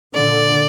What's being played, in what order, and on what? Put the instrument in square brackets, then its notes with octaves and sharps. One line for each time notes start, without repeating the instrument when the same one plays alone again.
[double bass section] A#2 D3 [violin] D5